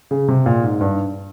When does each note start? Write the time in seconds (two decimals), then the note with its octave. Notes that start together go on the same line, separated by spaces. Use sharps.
0.11 C#3
0.28 C3
0.46 A#2
0.63 G#2
0.81 G2